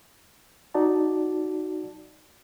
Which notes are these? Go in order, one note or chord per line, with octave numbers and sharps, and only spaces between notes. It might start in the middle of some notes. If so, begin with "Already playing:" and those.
D#4 F#4 D5 A5